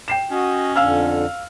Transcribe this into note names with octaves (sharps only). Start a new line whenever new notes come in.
G5 C7 E7
C#4 F#4 D#5
F2 D3 F5 E6 F6